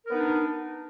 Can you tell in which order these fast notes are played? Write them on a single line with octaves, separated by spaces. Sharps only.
A#4 B3 D#4 D4